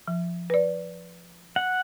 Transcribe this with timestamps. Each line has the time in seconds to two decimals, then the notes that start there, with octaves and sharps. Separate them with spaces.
0.07 F3
0.50 B4 D5
1.56 F#5